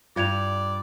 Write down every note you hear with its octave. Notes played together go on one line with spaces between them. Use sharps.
G2 F4 D5 G#6 F7